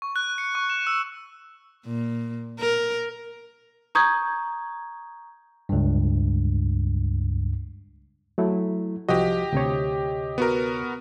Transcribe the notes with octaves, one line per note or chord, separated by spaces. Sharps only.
C#6
F#6
C#7
C#6
E7
E6
A#2
A#4
A#5 C#6 D#6 G6 G#6
C#2 G2
F#3 A3 E4
C2 F3 F#4 G4 D#5
D2 C3 C#5
B3 F#4 A#4